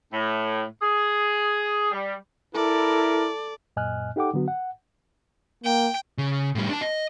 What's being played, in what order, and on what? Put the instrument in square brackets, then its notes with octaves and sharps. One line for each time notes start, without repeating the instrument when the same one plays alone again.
[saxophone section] A2
G#4
G3
[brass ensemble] E4 [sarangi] A4 [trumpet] A#4 [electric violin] D5
[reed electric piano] F#2 A#2 D#5 G#5 F6 F#6
D#4 G4 A4 F#5 G5 D6
D3 F#3 B3 F#4
F#5
[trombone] A#3 [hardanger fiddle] G5
[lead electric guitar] C#3
A2 G3
D4 A5
D#5